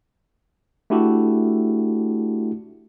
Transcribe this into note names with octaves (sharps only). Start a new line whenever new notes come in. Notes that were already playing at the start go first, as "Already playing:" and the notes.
A3 D4 E4 F#4 G4 A4